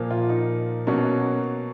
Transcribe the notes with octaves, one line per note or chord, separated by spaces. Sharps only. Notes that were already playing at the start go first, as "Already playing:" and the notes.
Already playing: A#2 F3 A#3
F4
D#4
B2 F#3 A#3 C#4